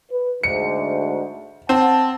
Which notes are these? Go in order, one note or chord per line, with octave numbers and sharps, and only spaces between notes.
B4
D2 G#2 C#7
C4 F#5 A5